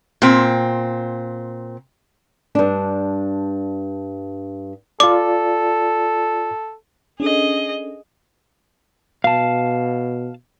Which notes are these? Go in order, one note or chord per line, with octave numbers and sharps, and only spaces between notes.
A#2 C4
G2 D4
F4 A4 D5 D6
C#4 D4 G#4 A4 D#5
B2 F5 A5